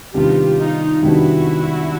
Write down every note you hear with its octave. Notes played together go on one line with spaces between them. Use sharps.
C3 D#3 G3 B3 D4 F4 G4
D#4 F4
C3 D#3 G3 B3 D4 E4 F#4